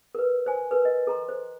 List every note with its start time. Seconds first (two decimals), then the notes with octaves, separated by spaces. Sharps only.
0.15 A#4 B4
0.46 C5 G#5
0.71 A#4 B4
0.85 D#5
1.07 A4 A#5 C6
1.29 C5